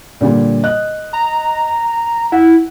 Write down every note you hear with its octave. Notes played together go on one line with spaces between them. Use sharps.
A#2 D3 G3
D#5 F#6
A#5
E4 F#5